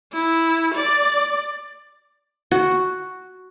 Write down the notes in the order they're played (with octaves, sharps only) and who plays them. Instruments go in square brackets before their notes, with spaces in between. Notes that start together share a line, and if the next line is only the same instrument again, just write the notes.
[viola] E4
D5
[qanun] F#4